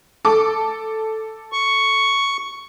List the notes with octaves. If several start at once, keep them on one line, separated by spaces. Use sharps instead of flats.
A4 D6
C#6